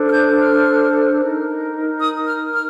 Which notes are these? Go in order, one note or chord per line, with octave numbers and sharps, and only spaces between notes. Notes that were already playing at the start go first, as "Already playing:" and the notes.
Already playing: D4 A4 C5
F6
G6
F6
D#4 A#4
D#6
F6
F6